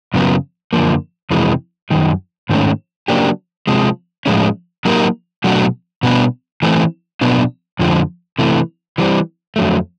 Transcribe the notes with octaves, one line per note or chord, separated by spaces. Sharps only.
F#2 C#3 F#3 B3
F#2 D3 F3 A#3
F2 C3 E3 G#3
F#2 D#3 G3
G#2 D#3 F#3 A3 C#4
C#3 F#3 A#3 D4 G4
C3 F3 G#3
A2 F3 G#3 C#4
F#3 A#3 D#4 G4 A#4
B2 F#3 A3 D4 F#4
B2 G3 B3 D4
E3 A3 C4
B2 F#3 B3 D4
F2 D3 F3 A3
C3 E3 A3
E3 G3 C4
F2 D3 F#3 A3